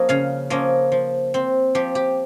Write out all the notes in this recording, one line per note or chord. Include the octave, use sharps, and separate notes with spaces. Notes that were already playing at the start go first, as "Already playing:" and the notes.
Already playing: F3 A#3 C#4 D#5
C#3 F5
F3 A#3 C#4 D#5
F3
C4
F3 G4
G4